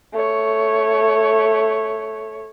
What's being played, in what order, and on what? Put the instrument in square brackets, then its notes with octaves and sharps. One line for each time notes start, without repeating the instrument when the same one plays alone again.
[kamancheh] A3 C#5